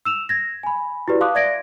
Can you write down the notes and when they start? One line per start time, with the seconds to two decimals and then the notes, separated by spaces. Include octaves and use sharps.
0.05 E6 E7 F7
0.29 G#6 A#6
0.63 G#5 B5
1.08 E4 F#4 G4 B4 D5
1.21 F5 A5 C6 D6 D#6 F#6
1.35 D5 E5 G#6 A#6 D7